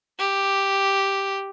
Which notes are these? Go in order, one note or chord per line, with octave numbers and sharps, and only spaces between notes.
G4